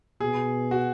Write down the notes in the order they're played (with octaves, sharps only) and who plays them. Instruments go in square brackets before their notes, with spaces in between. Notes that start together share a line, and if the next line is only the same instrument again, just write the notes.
[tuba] B2 [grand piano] G#4
[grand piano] F#4